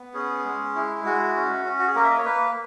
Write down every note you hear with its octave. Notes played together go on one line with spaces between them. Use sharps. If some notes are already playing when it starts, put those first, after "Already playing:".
Already playing: B3
C#4 G#4
G#3
E4
G#3 F#4
C#4
C#4
F#4
G#4
A#3 A#4
E5
D#5
C#5
A#3 B4